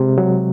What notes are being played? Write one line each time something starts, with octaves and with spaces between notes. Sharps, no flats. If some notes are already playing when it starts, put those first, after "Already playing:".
Already playing: C3 G#3
F#3